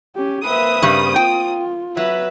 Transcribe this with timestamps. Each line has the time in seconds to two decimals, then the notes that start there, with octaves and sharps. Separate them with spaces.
0.16 C#4 G4
0.45 A#3 C4 B4 E5 D#6
0.82 G2 C#3 G3
1.16 F4 G5
1.97 F#3 B4 E5